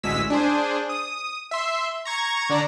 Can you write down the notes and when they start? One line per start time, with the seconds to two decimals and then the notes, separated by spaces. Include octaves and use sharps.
0.03 A1 D2 G#3 E6 B6
0.30 D4 G#4 C5
0.89 D#6
1.51 E5 C6
2.05 A#5 C#6 G#6
2.49 D3 D4 D5 A#5